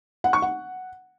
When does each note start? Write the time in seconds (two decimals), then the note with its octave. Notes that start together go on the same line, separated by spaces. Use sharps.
0.24 F#5
0.33 C#6
0.42 F#5